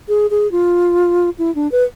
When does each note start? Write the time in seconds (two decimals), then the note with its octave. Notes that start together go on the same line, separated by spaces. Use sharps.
0.08 G#4
0.31 G#4
0.52 F4
1.39 E4
1.55 D4
1.72 B4